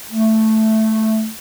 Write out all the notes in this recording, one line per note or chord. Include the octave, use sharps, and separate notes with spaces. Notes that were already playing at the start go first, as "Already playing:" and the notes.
A3